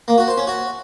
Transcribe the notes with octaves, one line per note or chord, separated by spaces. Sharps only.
A#3
F#4
C5
C#4
F#4